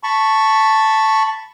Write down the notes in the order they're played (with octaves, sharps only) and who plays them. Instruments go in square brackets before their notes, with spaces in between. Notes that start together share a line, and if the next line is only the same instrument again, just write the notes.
[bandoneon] A5 B5 C#6